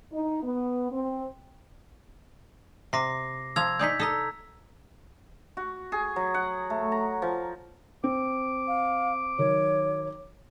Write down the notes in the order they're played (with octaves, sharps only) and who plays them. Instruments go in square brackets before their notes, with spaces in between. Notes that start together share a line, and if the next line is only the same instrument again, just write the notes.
[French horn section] D#4
B3
C4
[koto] C3 [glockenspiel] D6 A#6 C7
[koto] F3 A#5 [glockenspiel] E6 G#6 F7
[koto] D#4 G#4 D5 [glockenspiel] G6 B6
[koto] A4 D#5 [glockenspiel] A#5 E6
[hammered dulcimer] F#4
G#4
F#3
F#5
A3
A#5
F3
[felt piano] C4 [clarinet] D6
[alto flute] F5
[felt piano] D#3 F#3 [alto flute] C#5